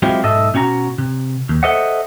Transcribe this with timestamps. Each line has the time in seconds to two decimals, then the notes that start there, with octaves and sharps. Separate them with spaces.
0.02 F#3 G#3 C4 E4 F4 G4
0.23 B1 G#2 A4 D#5 E5
0.54 B2 C#4 F#4 G5 A#5
0.98 C3
1.49 D#2
1.63 A4 C5 D#5 E5 F#5